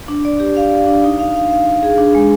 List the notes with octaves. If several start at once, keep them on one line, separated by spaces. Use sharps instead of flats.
D4
D5
G4
F5
D5
D4
D#4
F5
F5
F5
F5
G#4
D4
G#3